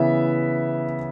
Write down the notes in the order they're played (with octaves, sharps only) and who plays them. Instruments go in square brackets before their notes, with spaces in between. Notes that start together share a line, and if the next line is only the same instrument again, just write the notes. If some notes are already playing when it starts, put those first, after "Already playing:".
Already playing: [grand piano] C#3 E3 B3 E4 E5